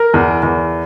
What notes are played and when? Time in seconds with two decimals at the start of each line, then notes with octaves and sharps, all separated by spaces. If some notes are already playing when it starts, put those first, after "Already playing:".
Already playing: A#4
0.14 E2
0.43 E2